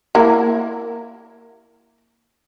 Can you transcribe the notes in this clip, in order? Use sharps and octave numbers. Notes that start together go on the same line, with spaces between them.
A#3 E4 A#4